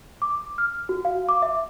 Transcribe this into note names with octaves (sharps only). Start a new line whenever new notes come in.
D6
F6
F#4
F5
D6
E5